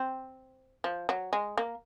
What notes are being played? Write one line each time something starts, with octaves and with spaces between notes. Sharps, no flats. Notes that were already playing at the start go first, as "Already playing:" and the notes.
Already playing: C4
F3
F#3
G#3
A#3